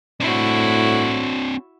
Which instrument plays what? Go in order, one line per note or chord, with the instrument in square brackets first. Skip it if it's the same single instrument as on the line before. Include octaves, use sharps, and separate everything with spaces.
[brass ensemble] A2 [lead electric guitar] C4 D4 [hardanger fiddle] E4 F#4